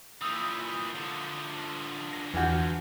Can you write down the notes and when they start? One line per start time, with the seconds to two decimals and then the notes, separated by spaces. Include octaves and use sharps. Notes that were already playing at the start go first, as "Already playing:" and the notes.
0.22 A#2 E3 D#6 E6 G6
0.95 D3 F3
2.12 A#6
2.34 E2 E3 F#4 F6 G6